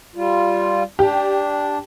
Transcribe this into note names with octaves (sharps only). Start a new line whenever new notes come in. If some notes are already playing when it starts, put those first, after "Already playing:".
G3 F4
D4 G4